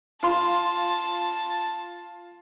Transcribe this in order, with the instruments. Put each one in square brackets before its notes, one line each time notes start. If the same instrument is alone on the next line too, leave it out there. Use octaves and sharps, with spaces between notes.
[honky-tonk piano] F4 C6 [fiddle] A5